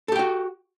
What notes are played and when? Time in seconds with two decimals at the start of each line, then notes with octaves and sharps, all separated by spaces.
0.08 A4
0.12 G4
0.16 G5
0.19 F#4